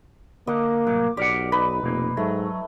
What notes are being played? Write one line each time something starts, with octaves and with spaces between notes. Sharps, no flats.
D3 A#3 D#5 D6
C2 A2 F#3 D6
B1 G4 A#4 D5 F#5
D#4 B4 B5
F1 B2 A#3
G#2 F#3 A3